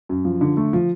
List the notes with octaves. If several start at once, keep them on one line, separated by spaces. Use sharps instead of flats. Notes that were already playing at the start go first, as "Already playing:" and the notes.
F#2
F3
D3
A3
F3